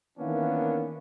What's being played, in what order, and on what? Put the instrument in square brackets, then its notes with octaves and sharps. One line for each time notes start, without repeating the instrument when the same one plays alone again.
[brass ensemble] D#3 E3 A#3 B3 C#4 D4